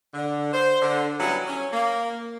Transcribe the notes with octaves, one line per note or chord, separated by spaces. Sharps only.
D3
C5
D3
F#3 G3 B3 C#4 E4 F#4
C#4
A#3